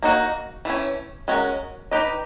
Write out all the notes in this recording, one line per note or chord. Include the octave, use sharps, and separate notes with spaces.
A#3 D#4 F#4
E3 A3 C#4
G#3 C#4 F#4 A#4
D#4 G4 B4 D#5